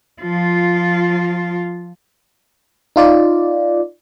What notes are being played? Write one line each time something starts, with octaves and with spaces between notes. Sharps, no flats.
F3 F4
D#4 F4 D5